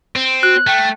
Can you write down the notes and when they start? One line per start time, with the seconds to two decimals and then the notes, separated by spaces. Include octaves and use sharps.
0.16 C4
0.43 F#4 F#6
0.67 A3 G5